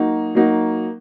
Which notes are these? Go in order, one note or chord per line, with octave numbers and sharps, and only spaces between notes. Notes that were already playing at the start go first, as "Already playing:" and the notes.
Already playing: F#3 A#3 D#4 F#4
F#3 A#3 D#4 F#4